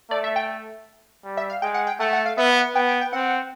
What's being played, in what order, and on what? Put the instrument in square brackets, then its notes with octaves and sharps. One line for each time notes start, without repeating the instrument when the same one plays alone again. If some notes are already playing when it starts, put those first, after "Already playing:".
[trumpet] A3 [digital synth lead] D5
[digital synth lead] E5
G5
[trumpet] G3
[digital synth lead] E5
F5
[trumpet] G#3 [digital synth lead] G5
[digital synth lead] F#5
G5
[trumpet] A3 [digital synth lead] F#5
[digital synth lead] F#5
F5
[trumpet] B3 [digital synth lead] E5
[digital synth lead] F#5
[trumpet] B3 [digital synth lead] G5
[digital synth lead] G5
G5
[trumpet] C4 [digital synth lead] F#5